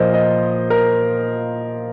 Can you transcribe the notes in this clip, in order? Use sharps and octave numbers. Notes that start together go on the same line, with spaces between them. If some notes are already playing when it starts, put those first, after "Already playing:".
Already playing: A#2 F3 A#4 C5 D#5
D#5
A#4